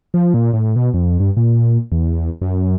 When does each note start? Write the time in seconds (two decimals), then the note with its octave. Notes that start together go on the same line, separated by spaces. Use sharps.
0.14 F3
0.34 A#2
0.53 A2
0.76 B2
0.94 F2
1.20 G2
1.37 A#2
1.92 E2
2.42 F#2